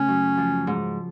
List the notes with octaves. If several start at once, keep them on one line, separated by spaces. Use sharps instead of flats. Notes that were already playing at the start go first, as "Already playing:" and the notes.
Already playing: C#3 A3 C#4
F#2
F3
G#2